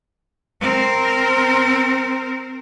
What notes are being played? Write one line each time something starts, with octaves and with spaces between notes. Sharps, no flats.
C4 A#4